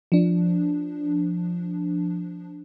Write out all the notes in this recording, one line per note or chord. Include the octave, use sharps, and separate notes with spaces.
F3 D4